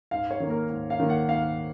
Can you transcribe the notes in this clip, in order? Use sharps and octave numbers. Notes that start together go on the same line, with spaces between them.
G#2 F5
C#5
D#3 A#3
A#4
G#2
F5
D#3 A#3
F#5
G#2 F5